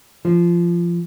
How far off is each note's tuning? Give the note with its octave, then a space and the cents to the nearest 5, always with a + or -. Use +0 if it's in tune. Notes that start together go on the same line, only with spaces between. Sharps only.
F3 -20